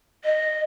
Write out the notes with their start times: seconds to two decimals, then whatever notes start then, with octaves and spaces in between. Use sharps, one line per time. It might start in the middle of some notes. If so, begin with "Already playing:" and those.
0.24 D#5